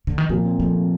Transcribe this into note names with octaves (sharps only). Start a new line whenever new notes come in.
D3
D#3
A#2 F3
C4
F3 A3
C4